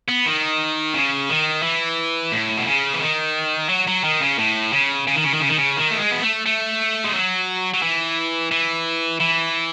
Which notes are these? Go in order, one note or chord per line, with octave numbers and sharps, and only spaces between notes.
B3
D#3
C#3
D#3
E3
A2
B2
C#3
E3
D#3
F#3
F#3
D#3
C#3
A2
C#3
C#3
D#3
C#3
D#3
C#3
D#3
C#3
D#3
A3
G#3
B3
A3
A3
G#3
F#3
F#3
E3
E3
E3